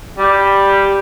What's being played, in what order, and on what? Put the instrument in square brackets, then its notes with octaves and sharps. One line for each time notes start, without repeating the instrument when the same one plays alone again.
[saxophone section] G3